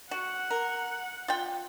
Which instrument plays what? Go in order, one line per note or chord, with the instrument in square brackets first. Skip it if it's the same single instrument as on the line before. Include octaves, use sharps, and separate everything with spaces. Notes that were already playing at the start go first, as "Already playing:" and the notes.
[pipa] F#4 [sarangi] F#5
[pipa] A#4
F4 G5